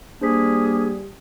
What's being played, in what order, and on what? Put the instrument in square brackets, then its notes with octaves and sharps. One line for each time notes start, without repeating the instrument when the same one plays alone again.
[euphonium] G3 [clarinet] A#3 [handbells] D4 C5 B6 [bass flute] G#4